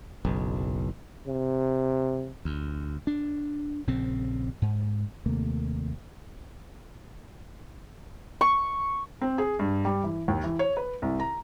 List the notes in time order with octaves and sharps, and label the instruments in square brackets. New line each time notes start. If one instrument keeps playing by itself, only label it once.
[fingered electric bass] F#1 B1
[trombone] C3
[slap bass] D2
D4
A#1 C#3 C4
G#2
[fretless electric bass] D#2 C3 A3 A#3
[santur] C#6
[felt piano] C4
G#4
G2
G3
E3
D#2
E3
C#5
B4
C2
A#5